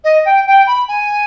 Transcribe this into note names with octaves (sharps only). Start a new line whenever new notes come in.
D#5
G5
G5
B5
G#5